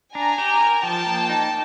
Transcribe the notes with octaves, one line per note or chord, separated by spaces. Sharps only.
D4 G#5 A#5
G4
A#4
F3 G5 A5
A#3
D#4